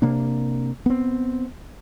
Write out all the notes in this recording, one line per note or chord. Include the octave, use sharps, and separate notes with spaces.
C3 A#3 D4
B3 C4